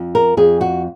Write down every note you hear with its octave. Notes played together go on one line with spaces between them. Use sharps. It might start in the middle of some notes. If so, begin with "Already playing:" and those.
Already playing: F2
A#4
F2 G#4
F#4